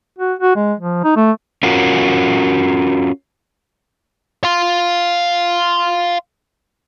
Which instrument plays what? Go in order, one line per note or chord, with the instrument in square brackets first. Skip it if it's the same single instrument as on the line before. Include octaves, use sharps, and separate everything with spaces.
[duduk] F#4
F#4
G#3
F3
D#4
A3
[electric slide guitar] C#4 F4 F#4 A#4
[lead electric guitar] F5 C6